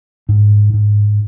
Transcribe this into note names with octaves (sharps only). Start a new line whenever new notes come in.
G#2
G#2